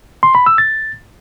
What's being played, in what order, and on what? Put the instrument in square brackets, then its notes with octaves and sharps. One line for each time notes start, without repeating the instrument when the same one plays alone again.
[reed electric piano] C6
B5
E6
A6